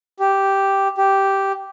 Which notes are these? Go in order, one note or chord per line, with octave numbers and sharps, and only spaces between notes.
G4
G4